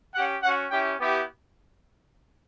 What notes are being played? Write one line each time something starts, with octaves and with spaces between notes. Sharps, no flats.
C#4 G4 F#5
C#4 F#4 F#5
C#4 E4 G4 G5
B3 E4 G4